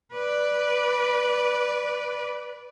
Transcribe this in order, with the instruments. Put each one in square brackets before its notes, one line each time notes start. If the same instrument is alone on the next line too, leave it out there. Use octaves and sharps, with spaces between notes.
[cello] B4 D5